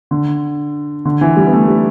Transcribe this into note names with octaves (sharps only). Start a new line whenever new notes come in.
D3
D3
E3
G3
B3
A3
G3